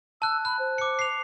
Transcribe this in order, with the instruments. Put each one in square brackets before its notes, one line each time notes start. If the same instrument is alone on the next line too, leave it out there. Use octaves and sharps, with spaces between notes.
[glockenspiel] A5 F#6 [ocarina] E6
[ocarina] B5 [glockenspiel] F#6
[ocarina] C5
[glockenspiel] D6 C#7
C7 F7